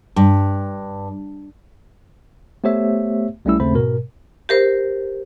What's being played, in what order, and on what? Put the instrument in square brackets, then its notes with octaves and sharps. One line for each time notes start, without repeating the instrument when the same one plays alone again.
[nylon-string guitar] G2
[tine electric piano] A3 B3 G4 C5 C#5 E5
B1 G3 A3 C#4 E4 E6
D#2 C#3 A3 C4 C5 B5
G#2 B2 A#4
[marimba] G4 A#4 C5